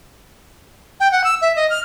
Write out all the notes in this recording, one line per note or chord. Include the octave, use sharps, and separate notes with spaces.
G5
F#5
E6
E5
D#5
F6